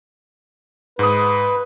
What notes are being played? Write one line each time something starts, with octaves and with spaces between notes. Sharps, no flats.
G#2 B4 D#6